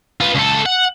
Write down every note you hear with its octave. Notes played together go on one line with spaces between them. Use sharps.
F4 B4
C#2 A4
F#5